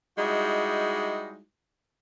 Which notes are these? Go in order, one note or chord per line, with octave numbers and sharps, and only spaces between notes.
G3 G#3 D#4 E4 F#4